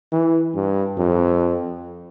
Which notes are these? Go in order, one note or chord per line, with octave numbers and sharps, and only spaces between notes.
E3
G2
F2